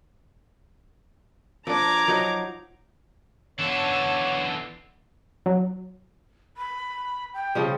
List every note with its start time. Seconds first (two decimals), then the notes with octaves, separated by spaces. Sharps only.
1.67 F3 D4 A#5 D6 G#6
2.07 F3 F#3 D#4
3.59 E3 B3 D4 F4 A4 C#5
5.46 F#3
6.57 B5
7.34 G5
7.55 C#3 F3 G3